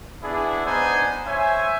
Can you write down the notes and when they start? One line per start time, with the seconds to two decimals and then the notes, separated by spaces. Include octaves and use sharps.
0.23 B3 D4 E4 G#4
0.65 B3 D4 D#4 C5 G#5
1.26 C5 C#5 E5 G#5